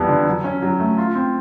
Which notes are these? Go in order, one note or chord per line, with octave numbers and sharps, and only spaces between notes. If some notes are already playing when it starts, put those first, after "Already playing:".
Already playing: F2 E3 G3 B3
D3
F#3
C#4
F#3
A3
F4
C4